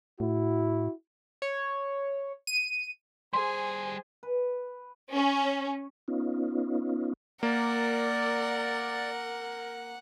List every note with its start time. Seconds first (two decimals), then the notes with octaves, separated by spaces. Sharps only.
0.20 A2 E4 F#4
1.42 C#5
2.47 D#7
3.33 G3 G#4 C5 G#5 C6
4.23 B4
5.14 C#4
6.08 B3 C#4 D#4 F4
7.43 A#3 A#4 D5 F#5